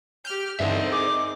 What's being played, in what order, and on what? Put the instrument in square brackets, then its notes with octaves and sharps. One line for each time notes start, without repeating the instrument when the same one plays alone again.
[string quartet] G4 F6 [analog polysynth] G6
[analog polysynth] G2 D3 E3 [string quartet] C4 D#4 A#4 [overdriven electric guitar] D5 E5
[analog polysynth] G#4 [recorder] D6